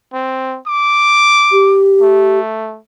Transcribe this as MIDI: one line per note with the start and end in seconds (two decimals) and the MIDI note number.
0.13 0.58 60
0.67 1.81 86
1.52 2.39 67
2.01 2.79 57